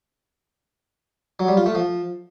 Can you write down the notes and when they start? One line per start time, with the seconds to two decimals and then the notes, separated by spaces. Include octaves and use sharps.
1.40 F#3
1.48 G3
1.57 F4
1.66 A3
1.75 F3